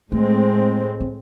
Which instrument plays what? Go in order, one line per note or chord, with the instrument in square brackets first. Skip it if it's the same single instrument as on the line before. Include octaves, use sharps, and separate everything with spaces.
[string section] A2 G#3 C4 [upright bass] A3
[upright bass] C4